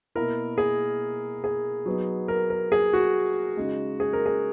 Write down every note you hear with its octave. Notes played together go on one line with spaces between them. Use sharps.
B2 A#3 E4 A#4
G#4
G#4
F#3 B3 D#4
A#4
A#4
G#4
F#4
C#3 G#3 D#4
G#4
A#4
G#4